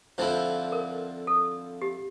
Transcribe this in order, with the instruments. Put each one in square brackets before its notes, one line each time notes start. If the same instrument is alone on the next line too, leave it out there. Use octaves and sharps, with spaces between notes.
[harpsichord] F2 D3 F3 C4 E4 [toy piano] C5
[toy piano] A#4
A4
G4